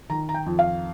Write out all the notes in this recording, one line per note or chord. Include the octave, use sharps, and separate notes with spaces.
D#3 A#5
A#5
G5
F2
F5